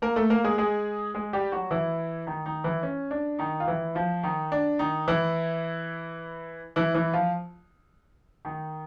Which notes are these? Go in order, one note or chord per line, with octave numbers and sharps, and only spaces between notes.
A#3 A#4
A3 A4
A#3 A#4
G#3 G#4
G#3 G#4
G#3 G#4
G3 G4
F#3 F#4
E3 E4
D#3 D#4
D#3 D#4
E3 E4
C#4
D4
D#3 D#4
F4
E3 E4
F3 F4
D#3 D#4
D4
D#3 D#4
E3 E4
E3 E4
E3 E4
F3 F4
D#3 D#4